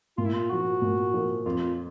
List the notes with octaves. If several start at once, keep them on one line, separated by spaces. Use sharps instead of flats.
A#2 F4
E4
F4
F3 A#3 F#4
A#2
F3 A#3
F2 F4